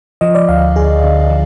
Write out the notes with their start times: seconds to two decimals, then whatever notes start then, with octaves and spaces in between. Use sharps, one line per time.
0.21 F3 D#5
0.35 D5
0.49 D2 F5
0.76 D2 G#4
1.03 D3
1.30 F3